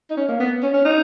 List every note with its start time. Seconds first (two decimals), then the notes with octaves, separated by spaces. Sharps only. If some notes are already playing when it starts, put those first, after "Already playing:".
0.11 D#4
0.17 C#4
0.29 A#3
0.40 B3
0.63 C#4
0.74 C#4
0.85 D#4